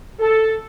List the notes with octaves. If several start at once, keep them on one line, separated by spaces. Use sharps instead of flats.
A4